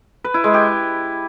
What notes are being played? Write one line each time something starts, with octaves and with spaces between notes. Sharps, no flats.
B4
E4
G#3
G4